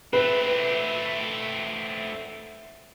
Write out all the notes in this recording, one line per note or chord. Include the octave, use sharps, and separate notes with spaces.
A3 C4 B4